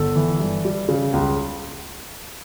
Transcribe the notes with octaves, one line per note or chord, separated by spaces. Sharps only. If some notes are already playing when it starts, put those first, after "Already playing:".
Already playing: G1 A4
E3
G2
G3
C#3
C#2